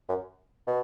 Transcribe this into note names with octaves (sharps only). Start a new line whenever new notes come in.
F#2
B2